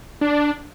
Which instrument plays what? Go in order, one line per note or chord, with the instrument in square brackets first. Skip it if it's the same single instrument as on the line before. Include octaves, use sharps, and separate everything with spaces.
[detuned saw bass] D4